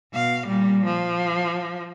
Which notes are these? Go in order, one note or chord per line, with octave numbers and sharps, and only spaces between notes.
B2 F5
A#2 G3
F3